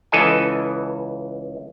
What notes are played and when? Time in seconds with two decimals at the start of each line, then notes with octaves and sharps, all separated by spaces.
0.12 C#2 E3 A4 D#5 G#5